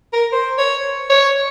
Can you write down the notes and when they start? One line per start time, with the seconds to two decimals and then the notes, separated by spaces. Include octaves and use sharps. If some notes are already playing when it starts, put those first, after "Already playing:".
0.13 A#4
0.32 C5
0.58 C#5
1.10 C#5